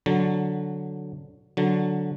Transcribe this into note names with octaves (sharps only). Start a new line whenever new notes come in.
D3 F#3
D3 F#3